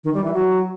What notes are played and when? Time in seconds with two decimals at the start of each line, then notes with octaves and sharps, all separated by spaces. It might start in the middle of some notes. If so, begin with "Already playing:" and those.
0.04 D#3
0.14 G3
0.24 E3
0.34 F#3